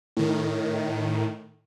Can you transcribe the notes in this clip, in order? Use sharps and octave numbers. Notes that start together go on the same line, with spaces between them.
A2 D#3